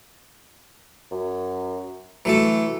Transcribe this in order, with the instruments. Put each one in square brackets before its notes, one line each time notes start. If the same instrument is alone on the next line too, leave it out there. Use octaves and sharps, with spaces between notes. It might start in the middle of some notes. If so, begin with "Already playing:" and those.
[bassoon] F#2
[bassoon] E3 [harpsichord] F#3 A3 A4